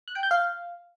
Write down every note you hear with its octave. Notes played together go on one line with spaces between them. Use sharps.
F#6
G5
G6
F5